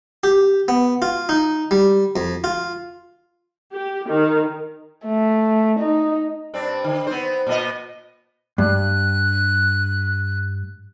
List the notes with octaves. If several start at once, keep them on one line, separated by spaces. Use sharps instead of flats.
G4
B3
F4
D#4
G3
F2
F4
G4
D#3
A3
D#4
G2 C4 D4
D3
B3 C4 C5
A#2 B3 D#5
G2 F#6